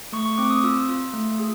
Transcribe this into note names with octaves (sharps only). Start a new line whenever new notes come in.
A3 C#6
C#6
C4 D6
D#6
F4 E6
F4
A3
G#4